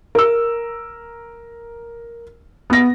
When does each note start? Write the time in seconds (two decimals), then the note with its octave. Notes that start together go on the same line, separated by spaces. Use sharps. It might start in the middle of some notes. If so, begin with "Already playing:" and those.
0.15 A#4 E6
2.70 B3 A#6